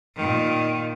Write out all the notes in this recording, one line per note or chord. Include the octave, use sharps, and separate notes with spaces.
A#2 D#3